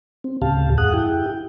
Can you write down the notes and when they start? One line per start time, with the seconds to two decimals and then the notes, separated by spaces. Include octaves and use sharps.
0.24 C4
0.42 D2 A2 C#3 G4 F5 A5
0.78 F2 G#2 G#4 F#5 D#6 F#6
0.94 E4 G4 G5